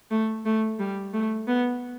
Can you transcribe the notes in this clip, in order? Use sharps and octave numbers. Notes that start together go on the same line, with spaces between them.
A3
A3
G3
A3
B3